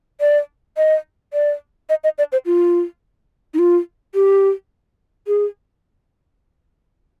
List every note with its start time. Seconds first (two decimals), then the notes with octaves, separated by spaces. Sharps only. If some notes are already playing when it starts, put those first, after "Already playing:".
0.21 D5
0.77 D#5
1.33 D5
1.89 D#5
2.04 D#5
2.18 D5
2.32 C5
2.46 F4
3.54 D#4
3.59 F4
4.15 G4
5.27 G#4